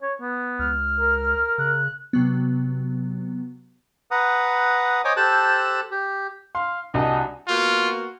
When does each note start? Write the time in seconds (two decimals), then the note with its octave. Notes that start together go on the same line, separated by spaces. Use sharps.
0.02 C#5
0.21 B3
0.59 C#2 F6
0.99 A#4
1.58 C#3 F#6
2.13 C3 F#3 B3
4.11 B4 F#5 A#5 D#6
5.05 C5 C#5 D#5 G#5 D6 D#6
5.17 G4 A4 C5 A5 E6 F#6
5.91 G4
6.55 F5 C6
6.94 C2 D4 F#4 G4 D#5 F#5 G#5 A5
7.48 A#3 B3 F4 F#4